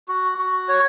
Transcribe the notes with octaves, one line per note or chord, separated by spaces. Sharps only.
F#4
F#4
C#5